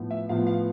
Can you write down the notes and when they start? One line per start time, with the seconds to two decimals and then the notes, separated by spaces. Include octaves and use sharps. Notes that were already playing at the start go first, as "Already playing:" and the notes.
Already playing: A2 F3 B3
0.11 E5
0.29 A2 F3 B3 F5
0.47 F5